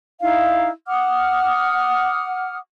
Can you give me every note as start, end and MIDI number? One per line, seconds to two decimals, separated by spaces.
0.20 0.69 63
0.20 0.69 64
0.20 0.69 77
0.88 2.58 78
0.88 2.58 86
0.88 2.58 87
0.88 2.58 89